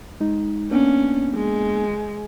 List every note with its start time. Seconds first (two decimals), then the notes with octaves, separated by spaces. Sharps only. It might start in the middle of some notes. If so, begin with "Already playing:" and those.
0.20 G#3 D#4
0.71 A#3 B3 C#4 D4
1.35 G#3